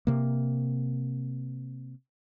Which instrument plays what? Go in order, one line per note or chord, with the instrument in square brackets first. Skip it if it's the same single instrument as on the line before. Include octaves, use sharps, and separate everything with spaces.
[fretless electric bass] C3 A#3